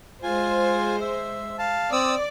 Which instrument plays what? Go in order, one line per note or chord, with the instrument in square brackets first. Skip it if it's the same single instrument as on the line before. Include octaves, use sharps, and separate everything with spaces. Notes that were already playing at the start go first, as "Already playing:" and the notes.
[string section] G#3 C5 [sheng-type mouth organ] F4 G#5
[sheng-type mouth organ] E5
F5 A5
[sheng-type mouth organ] C4 D#6 E6 [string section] D5